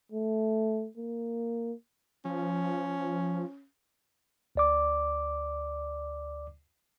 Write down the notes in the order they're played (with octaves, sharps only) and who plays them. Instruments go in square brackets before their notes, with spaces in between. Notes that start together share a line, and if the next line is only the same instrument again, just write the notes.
[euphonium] A3
A#3
[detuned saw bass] F3 [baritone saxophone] C#4
[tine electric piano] D2 D5 D6